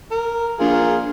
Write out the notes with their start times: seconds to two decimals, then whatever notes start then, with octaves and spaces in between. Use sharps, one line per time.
0.11 A#4
0.60 A#1 F4 G#4 A#4